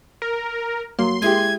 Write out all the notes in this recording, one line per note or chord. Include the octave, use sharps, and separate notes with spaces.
A#4
F#3 A#3 C6
G#3 E4 G4 G#6